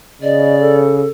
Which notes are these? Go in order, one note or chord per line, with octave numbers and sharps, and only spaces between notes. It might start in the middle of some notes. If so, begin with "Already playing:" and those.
C#3 D5 D#5
A4